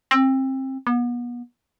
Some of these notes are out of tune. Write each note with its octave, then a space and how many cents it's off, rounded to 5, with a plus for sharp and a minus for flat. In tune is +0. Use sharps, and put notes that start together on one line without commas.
C4 +25
B3 -35